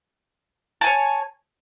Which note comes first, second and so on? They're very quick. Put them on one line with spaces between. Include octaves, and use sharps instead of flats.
A5 G#5 C#5